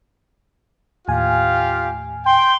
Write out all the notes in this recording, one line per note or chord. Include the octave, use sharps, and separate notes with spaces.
D#2 A2 F4 G4 F5 G#5
G5 C6